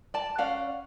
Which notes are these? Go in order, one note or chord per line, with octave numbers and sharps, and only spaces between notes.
D5 A5
C#4 D5 F5 F#5